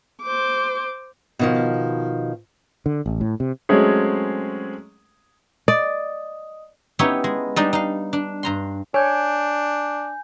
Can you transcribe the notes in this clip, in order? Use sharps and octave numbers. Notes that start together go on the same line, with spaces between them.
C5 D6
B2 D#3 F3
D3
A1
A2
C3
F#3 G#3 A3 C4 C#4 G#4
D5 D#5 D#6
B3 C#4 D#4 E4 G4 C#5
G#3
G3 D4 D#4 D5 D#5
D#4 F5
D4
G2 A#5 C6
D4 C#5 G#5 G6